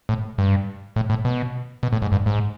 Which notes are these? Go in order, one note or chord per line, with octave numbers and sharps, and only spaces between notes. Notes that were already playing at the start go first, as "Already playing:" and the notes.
A2
G2
A2
A2
B2
B2
A2
G#2
G2
G#2